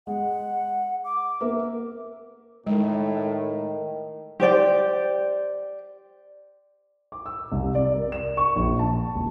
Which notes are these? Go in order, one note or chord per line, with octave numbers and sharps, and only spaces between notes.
G#3 F#5
D6
A#3 A#4 E5
A2 D#3 G#3
G4 C5 D5 G5
D6
E6
C2
D5
A#4
E7
C#6
A#1
A5
D#1